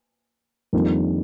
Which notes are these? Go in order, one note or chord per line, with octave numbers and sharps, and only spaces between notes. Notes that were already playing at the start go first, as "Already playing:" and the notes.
F2 D#3 G3 A#3 D4